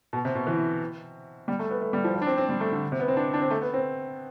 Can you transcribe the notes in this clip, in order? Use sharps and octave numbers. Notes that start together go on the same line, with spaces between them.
B2
C3
B2
E3
G3
A3
B3
A3
G3
F3
F3
D4
C4
C4
G3
A3
D3
C3
B3
C4
D4
D4
C4
A3
B3
C4